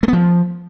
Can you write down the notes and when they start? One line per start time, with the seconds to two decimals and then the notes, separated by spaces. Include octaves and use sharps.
0.03 A3
0.08 B3
0.13 F3